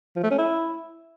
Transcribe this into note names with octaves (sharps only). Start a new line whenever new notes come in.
F3
A3
C#4
E4